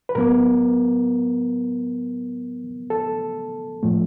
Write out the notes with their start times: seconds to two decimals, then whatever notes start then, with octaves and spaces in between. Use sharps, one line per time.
0.09 B4
0.15 A2 F#3 B3 A#4
2.90 A4
3.83 A2 F3 A3